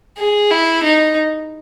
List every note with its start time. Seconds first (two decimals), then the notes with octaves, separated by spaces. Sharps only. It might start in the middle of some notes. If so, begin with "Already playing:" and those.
0.18 G#4
0.50 E4
0.82 D#4